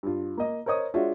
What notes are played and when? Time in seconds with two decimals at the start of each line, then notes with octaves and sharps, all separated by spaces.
0.03 G2 F4
0.37 A#3 D#5
0.66 A#4 C5 C#5 D#5 D#6
0.94 G#3 D4 F4 F#4 C#5 E5